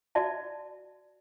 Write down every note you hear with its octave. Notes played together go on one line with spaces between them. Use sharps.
F#4 D5 E5 A5